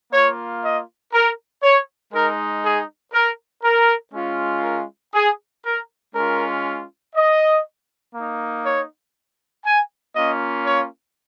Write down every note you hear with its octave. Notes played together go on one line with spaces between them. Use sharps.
A#3 F4 C#5
D#5
A#4
C#5
G#3 D#4 A#4
G#4
A#4
A#4
G#3 C#4 F4
A#4
G#4
A#4
G#3 C#4 F4 A#4
D#5
A#3 D#4
C#5
G#5
A#3 C#4 F4 D#5
C#5